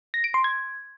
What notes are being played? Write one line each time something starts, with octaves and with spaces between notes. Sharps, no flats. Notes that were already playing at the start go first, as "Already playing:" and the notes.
A#6
D7
C6
G#6